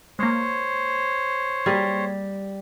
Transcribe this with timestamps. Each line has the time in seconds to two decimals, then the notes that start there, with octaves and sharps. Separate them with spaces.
0.19 G#3 A#3 C5 C#5
1.66 G3 A#3 G#4